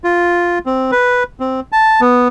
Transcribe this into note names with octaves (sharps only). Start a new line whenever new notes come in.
F4
C4
B4
C4
A5
B3